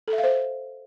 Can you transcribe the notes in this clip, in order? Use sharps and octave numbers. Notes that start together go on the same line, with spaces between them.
A4
E5
F5
C5